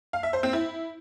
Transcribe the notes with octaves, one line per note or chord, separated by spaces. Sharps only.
F5
E5
C5
C4
E4